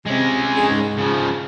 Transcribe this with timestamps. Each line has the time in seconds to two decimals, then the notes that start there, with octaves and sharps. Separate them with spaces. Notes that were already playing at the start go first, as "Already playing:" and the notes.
0.07 C3 G#3 C#4
0.56 F2 D4 G#4
0.69 G#2
0.98 C#3 F3